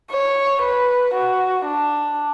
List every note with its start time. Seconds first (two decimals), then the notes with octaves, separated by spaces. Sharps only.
0.11 C#5
0.62 B4
1.14 F#4
1.65 D4